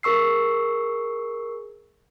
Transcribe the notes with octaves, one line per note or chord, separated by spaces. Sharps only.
G#4 A#4 C#6 E6 C7